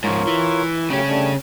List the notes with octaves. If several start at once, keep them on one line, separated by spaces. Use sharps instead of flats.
G#2 F3 F4 A#4 C#5
E3
C#3 F#3 A3 C#4 G4
G3 A3 D4